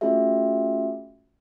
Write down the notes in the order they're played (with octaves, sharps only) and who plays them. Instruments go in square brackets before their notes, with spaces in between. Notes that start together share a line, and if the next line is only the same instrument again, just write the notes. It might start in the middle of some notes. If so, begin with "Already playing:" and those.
[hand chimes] A3 C#4 F4 F#4 G#4 E5